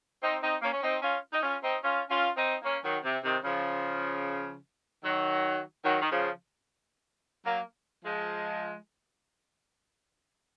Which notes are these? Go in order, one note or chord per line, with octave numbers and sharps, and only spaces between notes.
C4 D#4
C4 D#4
A#3 C#4
C#4
C4 D#4
C#4 F4
D#4
C#4 F4
C4 D#4
C#4 F4
C#4 F4
C4 D#4
A#3 C#4
D#3 F#3
C3
C3 D#3
C#3 F3
D#3 F#3
D#3 F#3
D#3
C#3 F3
F#3 A#3
F3 G#3